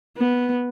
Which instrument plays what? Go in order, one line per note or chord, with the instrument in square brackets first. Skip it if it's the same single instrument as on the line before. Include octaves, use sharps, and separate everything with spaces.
[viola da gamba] B3